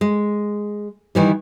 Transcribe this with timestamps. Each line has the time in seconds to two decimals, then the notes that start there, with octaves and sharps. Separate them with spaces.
0.01 G#3
1.15 D#3 E3 G3